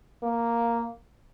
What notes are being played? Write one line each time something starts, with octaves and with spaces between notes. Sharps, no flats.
A#3